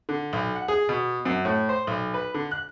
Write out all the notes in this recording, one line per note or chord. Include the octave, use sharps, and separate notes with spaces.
D3
B1
F#5
G#4
B2
F#2
A2
C5
B1
B4
D3
F#6